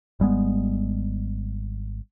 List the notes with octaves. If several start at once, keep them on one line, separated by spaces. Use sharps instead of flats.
G#1 G3 G#3 B3